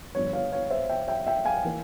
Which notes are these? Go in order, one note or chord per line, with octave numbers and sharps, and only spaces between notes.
G1 G2 F3 C#5
C#5 F5
C#5 F5
C5 E5
E5 G5
E5 G5
E5 G5
F5 G#5
E3 A#3